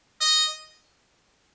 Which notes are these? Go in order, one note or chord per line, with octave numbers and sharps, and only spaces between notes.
D#5